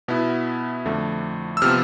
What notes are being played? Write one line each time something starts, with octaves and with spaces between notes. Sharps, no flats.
B2 B3 E4
F2 D3 A3
E6
C3 F3 B3 F6